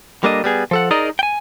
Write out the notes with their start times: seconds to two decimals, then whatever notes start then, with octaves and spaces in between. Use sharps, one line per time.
0.24 G3 A#3 D4 A4 D#5
0.44 G3 B3 G#4
0.71 F3 A4 F#5
0.91 D#4 G#4 A#4 D5 D#5
1.19 G5 G#5